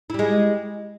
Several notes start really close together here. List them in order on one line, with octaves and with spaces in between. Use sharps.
E4 G3 G#3